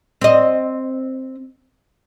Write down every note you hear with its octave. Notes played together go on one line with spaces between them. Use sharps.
C4 D#5